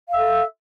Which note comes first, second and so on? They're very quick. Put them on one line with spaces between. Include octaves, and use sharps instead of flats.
F5 E5 A4